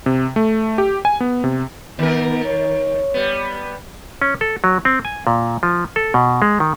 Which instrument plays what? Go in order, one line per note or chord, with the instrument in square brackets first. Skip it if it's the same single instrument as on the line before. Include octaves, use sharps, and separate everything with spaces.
[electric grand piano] C3
A3
G4
G#5
B3
C3
[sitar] D#3 A#4 [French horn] B3
[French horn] C#5
[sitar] G3 B3
[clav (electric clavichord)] C#4
A4
F#3
C4
G#5
A#2
F3
A4
B2
G#3
D#3